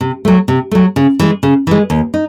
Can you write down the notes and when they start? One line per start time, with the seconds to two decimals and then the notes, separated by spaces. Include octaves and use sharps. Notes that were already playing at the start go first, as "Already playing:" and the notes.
0.01 C3
0.25 F#3 A3
0.48 C3
0.71 F#3 A3
0.96 C#3
1.19 E3 G#3
1.43 C#3
1.67 E3 G#3
1.90 D#2
2.14 D#4